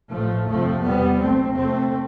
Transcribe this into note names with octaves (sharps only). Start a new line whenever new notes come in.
A1 A2 F3 A3
G1 F2 C3 F3 A3
F1 E2 B2 G3 B3
B1 B2 A3 C4
F1 F2 C3 A3 C4